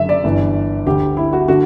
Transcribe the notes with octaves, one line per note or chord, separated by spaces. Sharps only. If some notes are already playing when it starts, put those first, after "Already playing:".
Already playing: F#1 F#2 D3 E5
D5
G1 G2 E3
D2 D3 G4
E4
F#4
D3 F#4